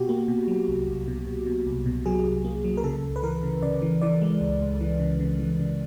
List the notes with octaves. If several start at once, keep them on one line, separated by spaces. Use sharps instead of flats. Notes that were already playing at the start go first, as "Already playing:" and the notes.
Already playing: B2 F#4 G4
A#3
B2
F#3
C2
C2
B2
B2
B2
C2
B2
F#3 G#4
C2
A#3
F#3
A#4
C#3 A4
C#2
B4
E3 A#4
C#3
C#3 D5
E3
E3 D5
G#3
C#2
C#2
E3
C#3
C#3
E3
C#3